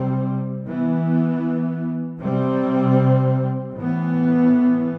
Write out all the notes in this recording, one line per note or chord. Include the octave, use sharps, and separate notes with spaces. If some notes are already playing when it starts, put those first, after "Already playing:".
Already playing: C3 G3 C4
E3 B3
C3 G3 C4
A2 E3 B3